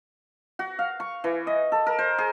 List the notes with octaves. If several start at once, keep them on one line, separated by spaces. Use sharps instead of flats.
F#4
F5
C#6
E3
D#5
A4
A#4
C5
G#4